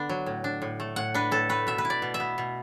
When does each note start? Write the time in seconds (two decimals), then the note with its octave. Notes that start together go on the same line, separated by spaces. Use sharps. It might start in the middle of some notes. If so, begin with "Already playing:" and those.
Already playing: D3 B3 D4
0.09 F#3
0.26 A2
0.44 D4
0.62 A2
0.80 A3
0.96 A2 F#5
1.14 D4 B4
1.31 A2 A4
1.49 A3 B4
1.67 B2 E5
1.78 B4
1.85 E4
1.90 D5
2.02 B2
2.14 E5
2.20 B3
2.38 B2